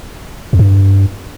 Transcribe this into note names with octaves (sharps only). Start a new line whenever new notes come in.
F2
G2